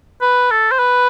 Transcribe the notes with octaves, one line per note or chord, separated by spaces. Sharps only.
B4
A4
C5
B4